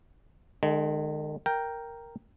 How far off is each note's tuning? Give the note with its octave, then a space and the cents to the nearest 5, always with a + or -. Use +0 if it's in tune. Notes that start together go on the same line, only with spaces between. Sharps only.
D#3 -40 G#3 +10
A#4 +0 G5 +0